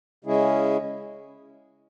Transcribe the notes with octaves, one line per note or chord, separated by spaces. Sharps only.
C#3 G#3 C#4 E4 G#4